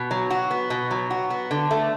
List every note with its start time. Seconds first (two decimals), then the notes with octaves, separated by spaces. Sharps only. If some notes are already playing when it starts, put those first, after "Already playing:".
Already playing: B2
0.11 F#3
0.30 F#4
0.51 B3
0.70 B2
0.91 F#3
1.11 F#4
1.30 B3
1.51 D3
1.71 A3